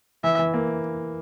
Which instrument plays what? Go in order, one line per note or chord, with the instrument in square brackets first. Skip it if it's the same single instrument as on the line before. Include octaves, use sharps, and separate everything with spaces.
[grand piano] E3 [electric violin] E5
[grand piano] E3
A#3